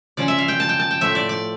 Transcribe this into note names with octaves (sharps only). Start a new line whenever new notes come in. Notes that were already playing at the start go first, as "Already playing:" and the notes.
C#3 F3 C#4 D5
E5
F5
G5
A5
G5
A5
G5
A2 F3 A3 E5
D5
D5